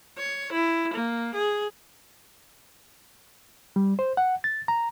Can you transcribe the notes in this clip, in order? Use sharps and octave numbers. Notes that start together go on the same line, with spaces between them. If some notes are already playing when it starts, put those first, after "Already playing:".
C#5
E4
A#3
G#4
G3
C5
F#5
A6
A#5